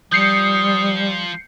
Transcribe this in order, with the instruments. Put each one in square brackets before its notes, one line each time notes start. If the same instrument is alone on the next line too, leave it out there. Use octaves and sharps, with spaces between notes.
[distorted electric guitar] F3 [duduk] G3 [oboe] D#6 [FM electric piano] G6 C7 C#7